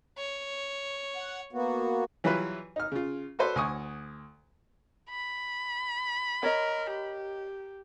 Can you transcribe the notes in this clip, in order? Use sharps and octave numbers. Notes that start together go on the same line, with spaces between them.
C#5
F#5
A#3 B3 F#4
E3 F#3 G3 E4 F4 B4
D#4 F6
C#3 F4
F#4 A4 B4 C5 D5
D2 G#5 C#6 D#6
B5
A#4 C#5 D#5
G4